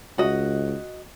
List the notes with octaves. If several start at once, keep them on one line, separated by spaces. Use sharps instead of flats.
C#2 F#4 D#5